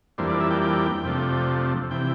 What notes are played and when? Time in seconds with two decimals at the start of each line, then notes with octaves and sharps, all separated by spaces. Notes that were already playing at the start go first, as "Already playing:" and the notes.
0.18 F2 E3 G3 A#3 D4 C5
0.29 D5
0.40 E5
0.51 G5
0.61 G5
1.05 F2 C3 F3 A3 D4
1.91 C3 E3 G5